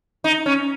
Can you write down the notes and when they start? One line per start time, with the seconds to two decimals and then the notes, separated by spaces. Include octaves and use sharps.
0.24 D#4
0.46 C#4